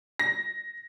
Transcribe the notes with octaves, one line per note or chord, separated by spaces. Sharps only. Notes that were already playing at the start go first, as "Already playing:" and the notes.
A#6